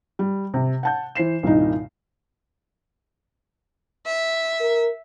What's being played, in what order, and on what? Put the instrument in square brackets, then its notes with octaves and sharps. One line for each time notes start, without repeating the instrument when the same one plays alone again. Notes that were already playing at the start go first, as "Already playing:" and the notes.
[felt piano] G3
C3
F#5 A5 G6
E3 C5 C7 E7
C2 G2 A#2 D#3 D#4
[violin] E5
[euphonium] A#4